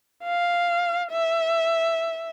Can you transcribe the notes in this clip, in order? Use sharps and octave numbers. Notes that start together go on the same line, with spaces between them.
F5
E5